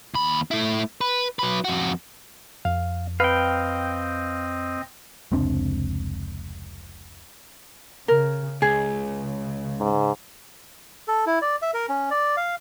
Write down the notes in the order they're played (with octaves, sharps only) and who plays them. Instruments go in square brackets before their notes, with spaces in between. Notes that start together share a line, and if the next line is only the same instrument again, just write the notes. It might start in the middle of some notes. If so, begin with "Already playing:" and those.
[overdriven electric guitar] D#2 B5
A3 E4
B4
F#3 B4
F2 F#4
[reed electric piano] F2 [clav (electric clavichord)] F5
[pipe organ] C4 D#5 [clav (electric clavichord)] B4 [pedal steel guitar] F5 G5
[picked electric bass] F1 C#2 C4 D4
[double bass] C#3 [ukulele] A#4
[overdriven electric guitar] C#2 [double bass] C#3 [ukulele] G#4
[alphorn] G#2
[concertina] A4
E4
D5
E5
A#4
C#4
D5
F5